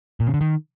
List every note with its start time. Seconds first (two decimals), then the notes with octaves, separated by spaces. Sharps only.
0.20 A#2
0.27 C#3
0.34 D3
0.41 D#3